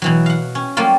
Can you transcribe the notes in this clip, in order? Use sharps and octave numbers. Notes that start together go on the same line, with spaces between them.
B2 E3 F#3
F5 F#5
C#4
F#3 G3 A3 A#3 F4